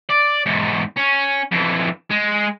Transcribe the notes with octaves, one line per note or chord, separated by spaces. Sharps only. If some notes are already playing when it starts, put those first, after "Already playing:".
D5
E2 G#2
C#4
F2 E3
G#3